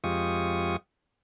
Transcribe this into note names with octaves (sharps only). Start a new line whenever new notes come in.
F2 G#3 F4 G4 C#6 D#6